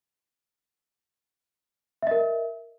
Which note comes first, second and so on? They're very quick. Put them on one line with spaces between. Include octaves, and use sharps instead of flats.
E5 D#5 A#4